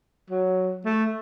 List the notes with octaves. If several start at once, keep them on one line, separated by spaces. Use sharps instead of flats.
F#3
A3